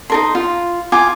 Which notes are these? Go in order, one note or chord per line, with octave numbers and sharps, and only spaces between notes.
D#4 A#4 C6
F4
F4 G#5 D6